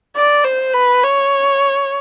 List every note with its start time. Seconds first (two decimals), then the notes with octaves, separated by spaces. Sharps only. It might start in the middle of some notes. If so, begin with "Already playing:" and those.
0.16 D5
0.44 C5
0.73 B4
1.04 C#5